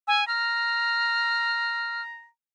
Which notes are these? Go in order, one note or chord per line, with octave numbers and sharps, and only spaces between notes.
G#5 E6
A#5 F6